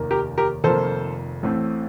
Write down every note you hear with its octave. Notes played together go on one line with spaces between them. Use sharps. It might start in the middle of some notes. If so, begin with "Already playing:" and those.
Already playing: F1 D#2 D#3 A#3
G4 A#4
G4 A#4
F1 F2 D#3 A#3 A4 C5
A1 A2 A3 C4